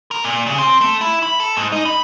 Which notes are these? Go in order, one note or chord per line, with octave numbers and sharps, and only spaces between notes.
A#4
A#2
C#3
C4
A3
E4
B5
A4
G#2
D#4
B5